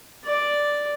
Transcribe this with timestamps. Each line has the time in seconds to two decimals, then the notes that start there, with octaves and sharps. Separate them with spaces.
0.25 D5